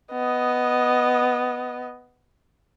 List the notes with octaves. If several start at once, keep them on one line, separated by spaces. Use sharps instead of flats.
B3 D#5